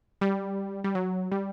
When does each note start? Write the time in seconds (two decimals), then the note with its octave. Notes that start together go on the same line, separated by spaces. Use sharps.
0.21 G3
0.84 G3
0.95 F#3
1.32 G3